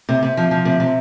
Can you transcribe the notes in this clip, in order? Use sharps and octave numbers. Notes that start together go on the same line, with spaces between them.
C3
C3
F3
F3
C3
C3